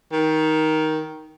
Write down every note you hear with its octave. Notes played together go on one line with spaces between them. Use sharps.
D#3